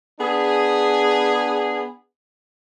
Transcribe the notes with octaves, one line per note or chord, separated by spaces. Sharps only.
B3 D4 G#4